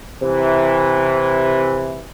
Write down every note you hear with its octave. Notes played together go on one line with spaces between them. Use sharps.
C3 E3